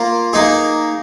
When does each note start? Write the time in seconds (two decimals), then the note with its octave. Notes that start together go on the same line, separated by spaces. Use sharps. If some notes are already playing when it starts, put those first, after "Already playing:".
Already playing: A#3 F4 A#4
0.33 A#3 D#4 G#4